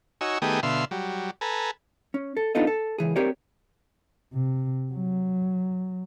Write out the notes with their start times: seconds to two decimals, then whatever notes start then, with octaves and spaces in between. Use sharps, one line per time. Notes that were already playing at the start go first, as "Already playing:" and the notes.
0.21 D#4 F#4 C#5 G#5 E6
0.42 D#3 A3 B3 G4 G#4 D#6
0.63 B2 D3 E5 F5 C6
0.91 F#3 G3
1.41 A4 B4 G#5 A#5
2.14 C#4
2.37 A4
2.55 B3 D4 D#4 F4 A4 D#5
2.67 A4
2.98 C#2 E3 G#4
3.16 C4 G4 A#4 C#5 D5
4.33 C3
4.92 F#3